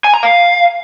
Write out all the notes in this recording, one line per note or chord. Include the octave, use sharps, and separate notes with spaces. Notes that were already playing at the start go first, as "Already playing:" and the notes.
G#5
A#5
F5